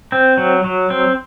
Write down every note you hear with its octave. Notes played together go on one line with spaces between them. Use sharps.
C4
F#3
F#3
C4